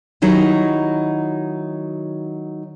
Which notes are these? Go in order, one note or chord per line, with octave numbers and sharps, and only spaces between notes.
D#3 F#3 D#4 E4 F#4 G4